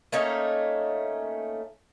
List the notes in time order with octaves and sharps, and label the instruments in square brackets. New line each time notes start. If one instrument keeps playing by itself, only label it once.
[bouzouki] A3 A#3 C#4 D#4